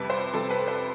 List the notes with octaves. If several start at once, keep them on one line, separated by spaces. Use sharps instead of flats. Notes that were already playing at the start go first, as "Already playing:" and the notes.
Already playing: F2 C3 G3 B4
C5
F2 C3 G3 A4
B4
C5